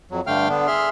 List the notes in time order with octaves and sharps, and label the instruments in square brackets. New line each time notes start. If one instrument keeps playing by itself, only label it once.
[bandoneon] F2 F#3
G2 D3 A3 F5 G5 F6
D3 B3 D4
G#4 E5 C6 F6